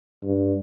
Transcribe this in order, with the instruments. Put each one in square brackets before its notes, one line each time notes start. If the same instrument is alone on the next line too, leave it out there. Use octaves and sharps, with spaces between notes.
[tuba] G2